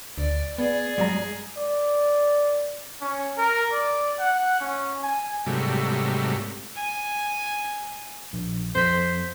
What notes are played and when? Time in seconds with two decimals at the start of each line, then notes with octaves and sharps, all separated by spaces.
0.18 D2 D5
0.58 B3 G#4 D5
0.98 G2 F#3 G#3 A#5
1.57 D5
3.01 C#4
3.37 A#4
3.72 D5
4.19 F#5
4.60 C#4
5.03 G#5
5.46 G#2 C3 F#3 G3 A3
6.76 G#5
8.33 A#1
8.75 F2 C5 B6